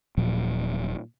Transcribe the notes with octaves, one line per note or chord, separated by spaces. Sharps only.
D#1 A#2 F3 F#3